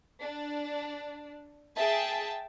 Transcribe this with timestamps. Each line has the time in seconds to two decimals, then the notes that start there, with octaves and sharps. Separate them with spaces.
0.22 D4
1.77 G#4 E5 G5 A5